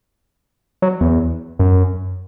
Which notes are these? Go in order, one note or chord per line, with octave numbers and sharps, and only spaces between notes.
F#3
E2
F#2